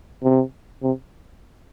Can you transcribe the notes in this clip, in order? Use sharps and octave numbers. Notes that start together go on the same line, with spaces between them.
C3
C3